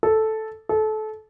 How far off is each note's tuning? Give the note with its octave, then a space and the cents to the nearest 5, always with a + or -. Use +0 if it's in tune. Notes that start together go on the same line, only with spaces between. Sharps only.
A4 -5
A4 -25